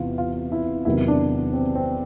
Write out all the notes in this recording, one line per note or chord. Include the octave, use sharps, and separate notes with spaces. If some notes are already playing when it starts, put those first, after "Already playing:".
Already playing: E2 C3 E3 F4
F4
E4
E2 C3 D#3 F#3 E4
D4
C4
C4